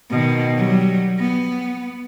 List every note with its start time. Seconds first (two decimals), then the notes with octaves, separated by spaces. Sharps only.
0.10 B2 D#3
0.56 F#3 G3
1.18 B3